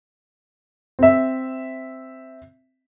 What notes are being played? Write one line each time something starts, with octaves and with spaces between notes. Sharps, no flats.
C4 E5